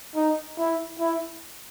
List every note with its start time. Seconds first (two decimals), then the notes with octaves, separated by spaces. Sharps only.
0.16 D#4
0.58 E4
0.99 E4